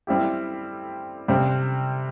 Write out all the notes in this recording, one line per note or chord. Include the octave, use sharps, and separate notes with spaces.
G3 C4 E4 G4
C3 G3 C4